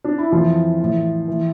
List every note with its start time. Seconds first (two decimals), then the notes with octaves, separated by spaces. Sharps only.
0.04 D4
0.18 E4
0.32 F2 E3 F3 F4
0.79 A2 E3
1.28 E3